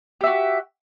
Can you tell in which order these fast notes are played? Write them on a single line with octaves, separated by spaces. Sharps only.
G4 E5 F#4